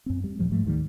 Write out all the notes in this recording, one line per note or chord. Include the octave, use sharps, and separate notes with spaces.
F#2 C4
G3
E2 A#2 F3 G3
G#2 F3 A3
D2 D#3 G3